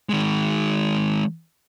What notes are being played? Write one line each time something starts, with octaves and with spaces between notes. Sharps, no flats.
D#3 G#3